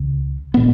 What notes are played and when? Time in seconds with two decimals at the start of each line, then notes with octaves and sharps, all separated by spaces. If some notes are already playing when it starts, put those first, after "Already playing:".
Already playing: C#2 C#3
0.54 A#2 B3